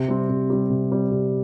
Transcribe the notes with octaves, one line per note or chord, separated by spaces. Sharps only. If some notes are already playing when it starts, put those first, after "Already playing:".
Already playing: C3
G3 C4
C3
G3 C4
C3
G3 C4
C3